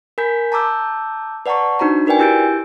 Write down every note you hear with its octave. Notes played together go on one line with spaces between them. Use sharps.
A#4 G#5 B5 G6 B6
A5 A#5 D6 E6 G6
B4 D5 F#5 A5 A#5 C#6
D4 D#4 F#4 C5 A#5
F#4 A#4 B4 D5 G5 G#5
E4 G4 E6 G6 A6 D7